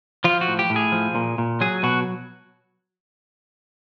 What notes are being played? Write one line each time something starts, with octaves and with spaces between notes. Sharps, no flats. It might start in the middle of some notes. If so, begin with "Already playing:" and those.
F3 F4
F#4
A2
G4
A2
G#4
F3
A#2
A#2
F#3 G#4
B2 F#4